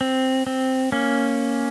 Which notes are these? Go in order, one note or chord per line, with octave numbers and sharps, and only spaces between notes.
C4
C4
A#3 C#4